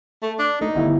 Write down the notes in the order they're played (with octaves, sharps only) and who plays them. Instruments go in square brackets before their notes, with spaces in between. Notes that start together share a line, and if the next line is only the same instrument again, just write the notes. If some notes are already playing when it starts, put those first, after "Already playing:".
[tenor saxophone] A3
D4
[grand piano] A3 [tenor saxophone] D#4
[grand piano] G1 E4